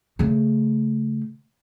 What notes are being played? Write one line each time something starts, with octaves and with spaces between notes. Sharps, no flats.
C#3 A3